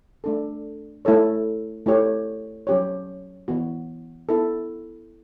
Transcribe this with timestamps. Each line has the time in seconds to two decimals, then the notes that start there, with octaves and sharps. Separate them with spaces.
0.24 A3 D4 A4
1.05 A3 E4 A4 C#5
1.86 A3 E4 G4 C#5
2.67 F#3 C#4 G4 C#5
3.48 E3 B3 F#4
4.29 B3 E4 A4